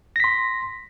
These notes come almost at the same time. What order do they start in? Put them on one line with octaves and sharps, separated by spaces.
A#6 B6 C6